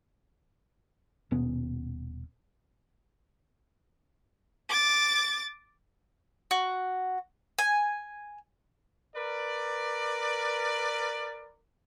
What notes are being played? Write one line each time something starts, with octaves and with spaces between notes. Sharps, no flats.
D#1 B2 B3 C#4
D6 A6
F#4
G#5
A#4 B4 D5